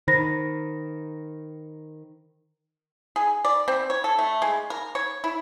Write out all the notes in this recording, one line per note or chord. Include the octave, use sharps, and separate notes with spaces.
D#3 C5 B5 A#6
G#4
D5
C4
C#5
A4
A3
G#3
A#4
C#5
E4